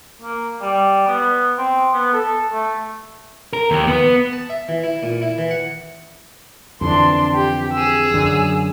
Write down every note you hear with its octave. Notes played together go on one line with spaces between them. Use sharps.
A#3
G3
B3
C4
B3
A4
A3
A#4
D#2
B3
A5
E5
E3
E4
A#2
E4
E3
F#5
F2 D3 E3 D4 C6
G4
G#4 E6
F#2 D3 F#3